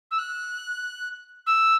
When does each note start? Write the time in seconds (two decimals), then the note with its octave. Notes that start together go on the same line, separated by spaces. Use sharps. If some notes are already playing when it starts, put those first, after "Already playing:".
0.10 E6
0.18 F#6
1.46 E6